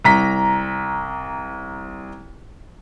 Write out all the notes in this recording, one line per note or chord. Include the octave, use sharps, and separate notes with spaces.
C2 A#5 B6